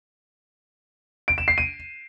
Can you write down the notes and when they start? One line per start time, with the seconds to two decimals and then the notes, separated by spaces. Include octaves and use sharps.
1.28 D7
1.38 E7
1.48 C7
1.58 D#7